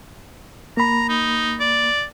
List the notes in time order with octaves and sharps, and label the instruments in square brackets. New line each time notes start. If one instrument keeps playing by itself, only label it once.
[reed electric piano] A#3 B5 [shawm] A#5
[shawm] D#4
D5